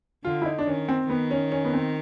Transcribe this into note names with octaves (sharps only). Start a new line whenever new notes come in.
D3 F4
E4
D#4
D4
D#3 C#4
C4
D#3 B3
C#4
C#4
B3
C4